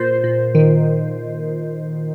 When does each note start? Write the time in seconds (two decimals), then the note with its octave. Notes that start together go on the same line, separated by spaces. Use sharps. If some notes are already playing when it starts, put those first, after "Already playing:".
Already playing: A#2 C5
0.24 A#2
0.55 D#3